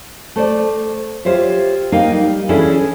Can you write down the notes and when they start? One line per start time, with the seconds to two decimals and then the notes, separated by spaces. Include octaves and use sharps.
0.36 A3 C5 D5
1.25 F4 G4 C5 C#5 E5
1.92 A#3 D#4 A#4 F5 G5
2.12 G3
2.49 E3 C#4 D4 E4 G#4 A4